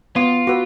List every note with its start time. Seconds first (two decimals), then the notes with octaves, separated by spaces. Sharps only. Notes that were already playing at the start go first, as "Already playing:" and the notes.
0.16 B3 F4
0.47 F#4 B4